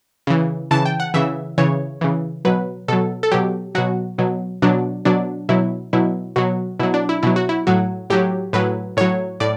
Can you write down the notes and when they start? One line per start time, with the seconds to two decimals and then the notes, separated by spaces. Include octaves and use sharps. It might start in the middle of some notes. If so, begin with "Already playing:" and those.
0.27 C#3 E3
0.71 C#3 E3 A5
0.86 G5
1.00 F#5
1.14 C#3 E3 E5
1.58 C#3 E3 C#5
2.01 C#3 E3
2.45 B2 F#3 B4
2.88 B2 F#3 A4
3.23 A4
3.32 B2 F#3 G4
3.75 B2 F#3 F#4
4.18 B2 F#3
4.62 B2 F#3 D4
5.05 B2 F#3 D4
5.49 B2 F#3 E4
5.93 B2 F#3 E4
6.36 B2 F#3 F#4
6.79 B2 F#3 E4
6.94 D4
7.09 E4
7.23 B2 F#3 E4
7.36 F#4
7.49 E4
7.67 A2 F#3 F#4
8.10 A2 F#3 G4
8.53 A2 F#3 B4
8.97 A2 F#3 C#5
9.40 A2 D5